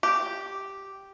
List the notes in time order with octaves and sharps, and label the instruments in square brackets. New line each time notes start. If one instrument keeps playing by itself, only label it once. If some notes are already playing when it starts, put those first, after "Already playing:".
[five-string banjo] G4